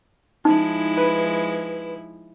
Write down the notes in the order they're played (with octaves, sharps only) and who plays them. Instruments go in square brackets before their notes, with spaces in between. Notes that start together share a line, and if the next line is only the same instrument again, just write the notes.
[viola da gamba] F3 G#3 E4 [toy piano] D#4
[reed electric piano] B4